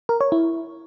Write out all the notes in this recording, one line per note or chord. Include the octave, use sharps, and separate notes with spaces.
A#4
C#5
E4